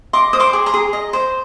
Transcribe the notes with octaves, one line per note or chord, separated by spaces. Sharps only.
D#5 C6 D6
C5 D#6
C6 D6
G#4
A#5 C6
G#4
D#5
C5